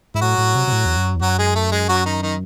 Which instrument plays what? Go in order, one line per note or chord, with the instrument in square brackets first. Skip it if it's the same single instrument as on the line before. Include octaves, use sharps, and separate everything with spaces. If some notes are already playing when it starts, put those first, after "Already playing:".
[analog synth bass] G#2 [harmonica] E4
[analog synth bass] A2 [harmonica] F#3 F#4
[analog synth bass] A2
C3
C3
A2
E2
F#2
E2
[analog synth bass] F#2 [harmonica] F#3 F#4
[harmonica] G#3 G#4
A3 A4
G#3 G#4
F#3 F#4
D#3 D#4
D#3 D#4